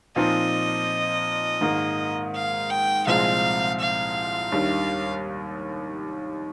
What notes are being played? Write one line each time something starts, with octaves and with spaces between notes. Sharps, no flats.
A#2 F3 C4 D#4 D#5
G#2 D#3 A#3
F5
G5
C2 A#2 F3 G#3 C4 F5
F5
D#2 D#3 G3 D4